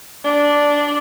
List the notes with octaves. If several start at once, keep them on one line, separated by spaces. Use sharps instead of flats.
D4